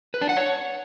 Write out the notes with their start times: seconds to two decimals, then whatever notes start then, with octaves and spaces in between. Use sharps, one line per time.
0.14 B4
0.21 D4
0.29 F#5
0.37 C#5